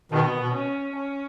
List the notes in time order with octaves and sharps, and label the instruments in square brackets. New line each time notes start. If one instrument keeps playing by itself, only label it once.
[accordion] B2 D#3 [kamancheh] B3
[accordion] B2
[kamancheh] C#4
C#4